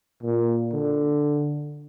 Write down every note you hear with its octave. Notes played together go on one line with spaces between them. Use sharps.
A#2
D3